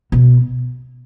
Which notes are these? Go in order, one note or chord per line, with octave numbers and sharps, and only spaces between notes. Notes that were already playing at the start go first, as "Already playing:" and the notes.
B2